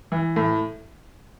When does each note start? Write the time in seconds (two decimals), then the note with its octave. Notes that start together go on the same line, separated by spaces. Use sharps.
0.12 E3
0.36 A2